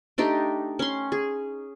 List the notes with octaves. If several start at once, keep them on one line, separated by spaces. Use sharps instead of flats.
A3 D4 D#4 G4
C#4 C6
G#4